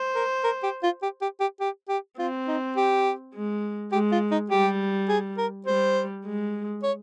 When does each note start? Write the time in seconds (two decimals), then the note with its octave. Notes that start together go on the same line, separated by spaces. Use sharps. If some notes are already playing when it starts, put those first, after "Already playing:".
Already playing: C5
0.15 A#4
0.44 A#4
0.63 G4
0.83 F4
1.02 G4
1.22 G4
1.40 G4
1.60 G4
1.89 G4
2.19 C4 F4
2.48 D#4
2.77 G4
3.34 G#3
3.92 G#3 G4
4.12 F4
4.31 D#4
4.50 G3 G4
5.09 G#4
5.38 A#4
5.67 G3 C5
6.25 G#3
6.83 C#5